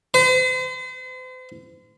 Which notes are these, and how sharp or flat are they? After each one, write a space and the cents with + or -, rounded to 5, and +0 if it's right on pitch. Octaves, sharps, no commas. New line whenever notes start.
C5 -40